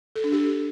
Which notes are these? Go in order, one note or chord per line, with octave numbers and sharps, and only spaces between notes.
A4
D4
G4